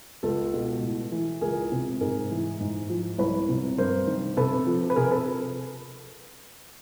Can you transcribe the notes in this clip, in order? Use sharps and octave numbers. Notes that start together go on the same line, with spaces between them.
C#2 A4
B2
A2
E3
C#2 G#4 A#4
C3
G#2 G#4 A#4
E3
G#2
F3
C2 B4 C#5
C3
G2 A#4 C5
D#3
C3 A4 B4
F3
B4
C3 G#4 A#4
A4 B4